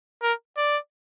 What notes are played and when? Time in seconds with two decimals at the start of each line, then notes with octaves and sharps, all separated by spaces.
0.23 A#4
0.57 D5